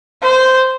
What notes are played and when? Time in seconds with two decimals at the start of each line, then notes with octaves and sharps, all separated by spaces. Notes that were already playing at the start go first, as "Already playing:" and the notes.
0.23 C5